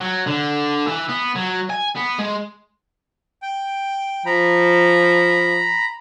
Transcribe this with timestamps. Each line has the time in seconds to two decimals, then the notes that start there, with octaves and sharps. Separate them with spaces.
0.01 F#3
0.27 D3
0.87 E3
1.09 B3
1.36 F#3
1.70 G#5
1.96 B3
2.19 G#3
3.42 G5
4.26 F3 A#5 B5